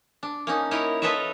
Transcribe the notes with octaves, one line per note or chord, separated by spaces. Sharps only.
D4
A#3 C#4 D#4
D#4 E4 A#4 C#5 D#5
F4 A4 B4 C#5 D#5 E5